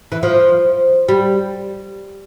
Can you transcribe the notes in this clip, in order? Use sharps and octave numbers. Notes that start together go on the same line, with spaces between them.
E3
F3
G3